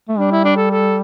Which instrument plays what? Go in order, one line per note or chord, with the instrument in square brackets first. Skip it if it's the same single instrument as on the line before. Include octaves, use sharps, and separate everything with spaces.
[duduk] A3
[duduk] G3 [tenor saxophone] D4
[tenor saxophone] E4
D4
A4
A4